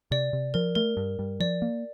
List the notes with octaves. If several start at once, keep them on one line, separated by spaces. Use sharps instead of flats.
C3 D5
C3
F3 A#4
A3 A#4
G2
G2
F3 D5
A#3